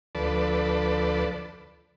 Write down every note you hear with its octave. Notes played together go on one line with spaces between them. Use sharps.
D2 F3 A4 B4 D5